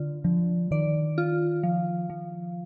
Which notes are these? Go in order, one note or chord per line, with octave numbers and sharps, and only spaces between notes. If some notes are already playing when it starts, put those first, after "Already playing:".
Already playing: D3 F4
D3 F3
D#3 D5
F4
F3
F3